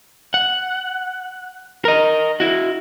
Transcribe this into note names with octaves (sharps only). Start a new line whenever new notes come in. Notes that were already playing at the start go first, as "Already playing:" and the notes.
F#5
A#4 D#5
E4 F#4